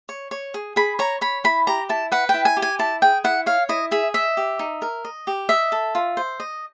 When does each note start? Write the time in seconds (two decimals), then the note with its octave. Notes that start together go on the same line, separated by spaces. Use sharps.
0.09 C#5
0.31 C#5
0.54 G#4
0.76 G#4 B5
0.99 C#5 A#5
1.21 C#5 B5
1.44 E4 B5
1.67 G4 A#5
1.89 E4 A5
2.12 B4 F#5
2.29 G5
2.34 E4
2.45 G#5
2.57 G4
2.62 G#5
2.79 E4 A5
3.02 G#4 G5
3.24 E4 F#5
3.46 C#5 F5
3.69 E4 D#5
3.91 G#4 E5
4.14 D#5 E5
4.37 G4
4.59 D#4
4.82 A#4
5.05 D#5
5.27 G4
5.49 D#5 E5
5.72 A4
5.95 F4
6.17 C5
6.40 D#5